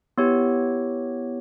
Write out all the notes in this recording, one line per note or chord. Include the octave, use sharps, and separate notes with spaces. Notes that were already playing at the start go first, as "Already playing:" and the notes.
B3 E4 G4 C#5